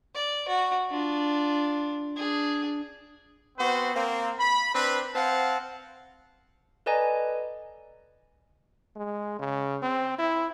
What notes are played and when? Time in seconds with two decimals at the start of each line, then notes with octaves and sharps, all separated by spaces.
0.15 D5
0.48 F#4
0.90 D4 F4
2.16 D4 G#4
3.58 B3 C4 F#4 C5
3.95 A#3 C4
4.40 B5
4.75 C4 D4 B4
5.15 C4 F5 F#5 A5
6.86 A4 B4 D5 D#5 G#5 A#5
8.96 G#3
9.39 C#3
9.82 C4
10.18 E4